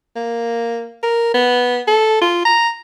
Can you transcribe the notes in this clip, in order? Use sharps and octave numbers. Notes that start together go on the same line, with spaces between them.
A#3
A#4
B3
A4
F4
A#5